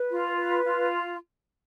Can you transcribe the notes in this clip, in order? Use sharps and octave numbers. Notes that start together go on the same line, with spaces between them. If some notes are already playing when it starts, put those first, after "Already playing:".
Already playing: B4
F4
B4
F4